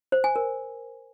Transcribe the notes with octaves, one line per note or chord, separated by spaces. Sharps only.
C5
G#5
A#4